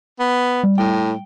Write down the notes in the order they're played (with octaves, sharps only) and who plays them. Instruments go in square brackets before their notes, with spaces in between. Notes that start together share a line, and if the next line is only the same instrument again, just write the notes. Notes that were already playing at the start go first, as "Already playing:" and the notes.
[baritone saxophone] B3
[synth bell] G3
[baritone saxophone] A2 [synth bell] G5